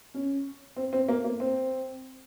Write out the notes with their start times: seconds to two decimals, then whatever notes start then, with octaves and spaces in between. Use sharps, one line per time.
0.14 C#4
0.76 C4
0.93 C4
1.08 A#3
1.24 A#3
1.40 C4